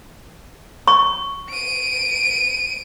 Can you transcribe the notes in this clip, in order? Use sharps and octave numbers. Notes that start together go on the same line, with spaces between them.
C#6
D7 D#7